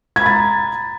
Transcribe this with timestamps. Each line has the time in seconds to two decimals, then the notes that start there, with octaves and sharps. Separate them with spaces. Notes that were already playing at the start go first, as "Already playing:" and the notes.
0.16 G#6
0.21 B5
0.26 A6
0.31 A#5